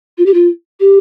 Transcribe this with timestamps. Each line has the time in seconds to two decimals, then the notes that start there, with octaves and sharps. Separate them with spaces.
0.18 F4
0.26 G4
0.34 F4
0.80 G4